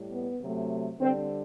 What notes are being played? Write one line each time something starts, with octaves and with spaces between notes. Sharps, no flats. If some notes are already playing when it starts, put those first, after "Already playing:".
Already playing: A2 G3
B3
C3 F#3 A3
D3 G3 C4